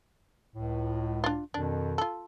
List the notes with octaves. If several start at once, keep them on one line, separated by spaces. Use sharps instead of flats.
C#2 A2
D4 F4
F2 B2 D#3 D4
F4 A4